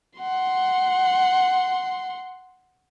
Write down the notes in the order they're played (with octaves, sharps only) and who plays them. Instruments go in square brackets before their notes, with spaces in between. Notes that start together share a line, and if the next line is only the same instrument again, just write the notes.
[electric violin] F#5 C6